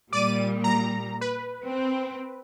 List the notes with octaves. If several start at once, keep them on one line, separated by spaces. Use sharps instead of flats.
A#2 G3 D5 D6 D#7
A#5
B4
C4